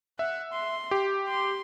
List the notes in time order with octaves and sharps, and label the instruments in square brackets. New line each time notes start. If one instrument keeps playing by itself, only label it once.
[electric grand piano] E5 [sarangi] F#5
[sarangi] C6
[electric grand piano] G4
[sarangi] C6